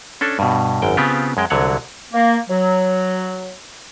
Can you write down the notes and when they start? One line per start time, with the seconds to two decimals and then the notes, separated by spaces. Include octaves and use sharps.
0.21 C#4 D4 A4
0.39 G2 B2
0.82 G#1 F#2 G5
0.97 C#3 B3 C4 F4 G4
1.37 F#2 G#3 G5
1.50 C2 D3 F#3 C#5 F#5
2.13 A#3
2.50 F#3